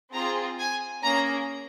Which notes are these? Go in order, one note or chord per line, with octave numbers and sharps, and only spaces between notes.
C4 F4 G#4 A#5
G#5
A#3 C#4 G#4 A#5